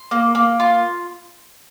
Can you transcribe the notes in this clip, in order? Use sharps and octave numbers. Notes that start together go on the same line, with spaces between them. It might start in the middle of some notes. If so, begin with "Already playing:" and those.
Already playing: C6
A#3
A#3
F4